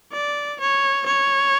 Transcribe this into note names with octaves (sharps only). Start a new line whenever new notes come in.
D5
C#5
C#5